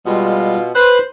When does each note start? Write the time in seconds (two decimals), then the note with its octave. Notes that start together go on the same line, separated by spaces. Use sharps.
0.06 B2 G3 G#3 F4
0.75 B4 C5 F#6